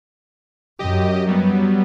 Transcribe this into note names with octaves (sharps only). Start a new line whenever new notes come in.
F#2 G4 D#5
F#3 G3 B3